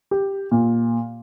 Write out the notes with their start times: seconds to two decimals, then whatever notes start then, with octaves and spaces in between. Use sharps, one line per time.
0.11 G4
0.51 A#2